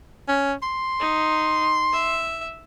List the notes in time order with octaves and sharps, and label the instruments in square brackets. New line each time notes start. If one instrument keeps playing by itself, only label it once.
[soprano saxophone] C#4
C6
[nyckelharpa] D#4
E5